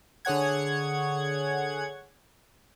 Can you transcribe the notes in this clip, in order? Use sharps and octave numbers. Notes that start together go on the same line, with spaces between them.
D3 G#4 C#5 F#5 G#6